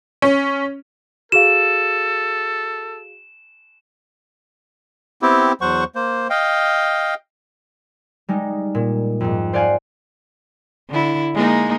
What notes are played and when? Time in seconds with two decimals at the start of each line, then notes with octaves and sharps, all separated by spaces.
0.22 C#4
1.32 F#4 G#4 A4 F5 E7
5.22 B3 C4 E4 G4
5.61 E2 F#3 C5 F#5 C#6
5.95 A#3 C5
6.30 D#5 F5 G5
8.29 G3 G#3 D#4
8.75 A#2
9.21 F2 G#2
9.53 C5 D5 F5 F#5 G#5
10.90 D3 E4
11.34 G#3 A#3 D#4